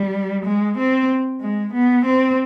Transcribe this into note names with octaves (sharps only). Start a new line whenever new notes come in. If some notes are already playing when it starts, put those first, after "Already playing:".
Already playing: G3
G#3
C4
G#3
B3
C4